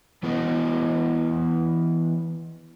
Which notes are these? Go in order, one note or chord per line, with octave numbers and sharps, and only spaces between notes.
E3 B3 E4 B4 D#5